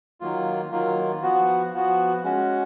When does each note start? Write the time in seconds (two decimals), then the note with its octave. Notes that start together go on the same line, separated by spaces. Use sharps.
0.21 D#3 F#3 A#3 F4
0.71 D#3 F#3 A#3 F4
1.22 F3 B3 F#4
1.73 F3 B3 F#4
2.24 G#3 C#4 F#4